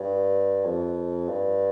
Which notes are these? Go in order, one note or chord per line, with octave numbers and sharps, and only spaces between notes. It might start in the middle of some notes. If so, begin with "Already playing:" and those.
Already playing: G2
F2
G2